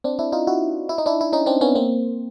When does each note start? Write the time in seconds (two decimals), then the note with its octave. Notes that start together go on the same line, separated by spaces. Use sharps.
0.04 C4 D4
0.19 D4 E4
0.32 D#4 F4
0.47 E4 F#4
0.89 E4
0.98 D#4
1.06 D4 E4
1.21 E4
1.33 C#4 D#4
1.46 C4 D4
1.61 B3 C#4
1.75 A#3 C4